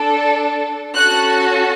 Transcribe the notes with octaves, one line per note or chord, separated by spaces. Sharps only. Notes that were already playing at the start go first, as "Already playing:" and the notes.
Already playing: D4 A4
C#4 F#4 A4 F#6